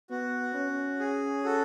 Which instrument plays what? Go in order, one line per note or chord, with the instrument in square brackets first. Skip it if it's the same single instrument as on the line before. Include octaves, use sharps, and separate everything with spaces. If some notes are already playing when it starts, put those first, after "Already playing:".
[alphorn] B3 [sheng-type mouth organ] F#4
[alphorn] C#4
[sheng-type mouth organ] G#4
F#4 A4